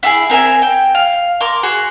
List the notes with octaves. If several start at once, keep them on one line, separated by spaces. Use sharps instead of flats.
E4 F#4 G#4
C4 A#4 E5 G#5
G5
F5
A#4 C6 D6
F#4 G#4